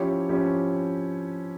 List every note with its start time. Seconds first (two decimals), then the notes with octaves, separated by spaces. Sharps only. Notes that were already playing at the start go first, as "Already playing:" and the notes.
Already playing: F3 C#4 E4 G4 C#5
0.29 F3 C#4 E4 G4 C#5